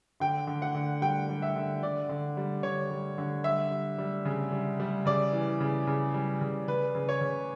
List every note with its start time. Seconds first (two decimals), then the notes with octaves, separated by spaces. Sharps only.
0.20 D3 G5
0.47 D3
0.62 F#5
0.75 D3
1.01 G3 G5
1.29 G3
1.42 E5
1.56 D3
1.83 D3 D5
2.09 D3
2.37 G3
2.63 D3 C#5
2.91 G3
3.18 D3
3.44 G3 E5
3.71 G3
3.98 G3
4.25 C#3
4.52 G3
4.80 G3
5.05 C#3 D5
5.32 E3
5.60 C#3
5.87 C#3
6.14 G3
6.41 C#3
6.68 C#3 B4
6.95 C#3
7.09 C#5
7.21 C#3